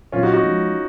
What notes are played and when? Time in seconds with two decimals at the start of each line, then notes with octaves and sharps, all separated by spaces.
0.12 A#2 F#3 C4 C#4 F4
0.23 D#4 F#4
0.33 D#4 F#4
0.43 F3 G#3 C#4